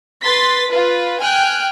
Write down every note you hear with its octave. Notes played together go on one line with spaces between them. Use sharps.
B4 C6 A6 B6
F4 B4
G5 G#5 F6 F#6